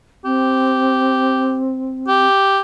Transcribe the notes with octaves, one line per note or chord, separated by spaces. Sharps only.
C4 G4
G4